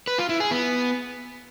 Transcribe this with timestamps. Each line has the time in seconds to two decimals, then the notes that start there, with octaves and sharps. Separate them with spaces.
0.07 B4
0.18 F4
0.29 E4
0.40 G#4
0.51 B3